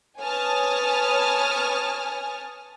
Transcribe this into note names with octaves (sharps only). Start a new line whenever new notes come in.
B4 C#5 G#5 A5 D#6 F6